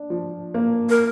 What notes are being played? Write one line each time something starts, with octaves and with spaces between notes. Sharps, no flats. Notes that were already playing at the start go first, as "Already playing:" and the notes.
Already playing: D4
F3
A#3
A#4